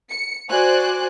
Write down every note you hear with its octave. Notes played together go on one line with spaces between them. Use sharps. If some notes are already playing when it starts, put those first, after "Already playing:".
C#7
F#4 C5 D5 G#5 F#6